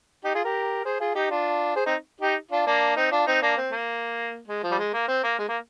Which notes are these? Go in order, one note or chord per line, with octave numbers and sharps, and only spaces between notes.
D#4 G4
F4 G#4
G4 A#4
G#4 C5
F4 G#4
D#4 G4
D4 F4
G#4 C5
C4 D#4
D#4 G4
D4 F4
A#3 D4
C4 D#4
D4 F4
C4 D#4
A#3 D4
C4
A#3
G#3
F3
G3
G#3
A#3
C4
A#3
G#3
A#3